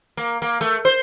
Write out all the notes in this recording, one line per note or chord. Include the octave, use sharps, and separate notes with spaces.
A#3
A#3
A3
C5